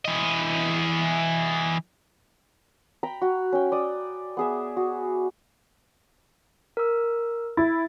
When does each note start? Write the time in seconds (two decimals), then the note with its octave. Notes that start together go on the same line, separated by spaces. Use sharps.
0.05 E3 D#5
3.03 G5 A#5 B5
3.22 F#4
3.52 C#4 G5
3.72 D5 D#6
4.37 B3 G#4 E5
4.77 F#4
6.77 A#4 E6
7.57 E4 A6